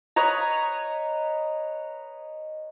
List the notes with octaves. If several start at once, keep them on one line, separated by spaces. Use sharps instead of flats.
B4 C#5 D#5 A#5